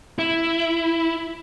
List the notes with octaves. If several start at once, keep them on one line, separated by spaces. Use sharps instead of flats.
E4